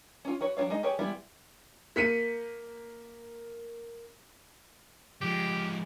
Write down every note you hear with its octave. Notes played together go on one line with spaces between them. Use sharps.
C#4 F4
F#4 B4 C#5
F#3 D4 F4 C#5 F5
G#3 D#4 D#5
G4 G#4 B4 C#5
E3 G3 G#3 B3 E4
A#3 B6 C#7 D#7
F3 G#3 G4